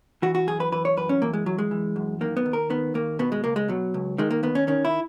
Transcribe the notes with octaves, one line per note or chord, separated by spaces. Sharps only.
E3 F#4
F#4
F#2 G#4
B4
E3 B4
C#5
F#2 B4
C#4
E3 A#3
G#3
F#2 F#3
G#3
E3
F#2
D#3 A#3
B3
D#2
A#4
D#3 B3
D#2 A#3
B2 B3
G#3
C#2 A#3
G#3
B2 F#3
C#2
D#3 G#3
A#3
D#2 B3
C#4
D#3 C#4
E4